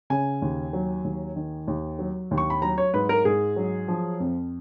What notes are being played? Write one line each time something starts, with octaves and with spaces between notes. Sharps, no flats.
C#3 G#5
D#2
F#3
D#2
D#3
D#2
F#3
D#2
C#6
B5
F#3 A#5
C#5
G#2 B4
A#4
G#2 G#4
F#3
F3
F2